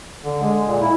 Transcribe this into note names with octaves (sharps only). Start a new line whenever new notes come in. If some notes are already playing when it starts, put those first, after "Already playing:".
D3
G#3
A#2
E4